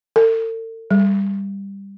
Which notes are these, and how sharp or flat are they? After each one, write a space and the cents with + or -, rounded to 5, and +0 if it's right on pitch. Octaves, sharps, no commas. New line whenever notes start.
A4 +45
G3 +10